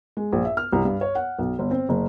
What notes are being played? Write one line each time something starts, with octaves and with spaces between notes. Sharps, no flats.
G#3
A#1
E5
F6
C2
G2
C#5
F#5
B1
G1
C4
F#1